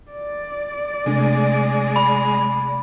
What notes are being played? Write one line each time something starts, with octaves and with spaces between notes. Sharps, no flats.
D5
C3 G#3 A3 D4
B5